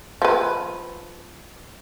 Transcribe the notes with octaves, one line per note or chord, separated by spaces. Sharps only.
F3 B4